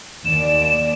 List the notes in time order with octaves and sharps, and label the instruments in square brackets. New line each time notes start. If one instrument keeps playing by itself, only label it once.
[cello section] D#2 D5 [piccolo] E7